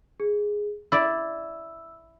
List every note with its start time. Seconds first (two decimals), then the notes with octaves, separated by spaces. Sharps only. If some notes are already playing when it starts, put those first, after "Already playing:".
0.20 G#4
0.92 E4 D5 E6